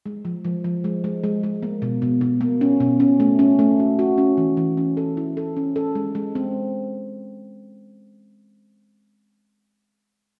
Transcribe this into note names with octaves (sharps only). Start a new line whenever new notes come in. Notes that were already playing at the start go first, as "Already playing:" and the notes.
G#3
F3
F3
F3
G#3
G#3
G#3
G#3
A#3
B2
B2
B2
A#3
C#4
B2
C#4
A3
C#4
A3
F#4
F#4
C#4
E3
E3
C#4
A4
E4
A4
C#4
A4
G#3
G#3
C4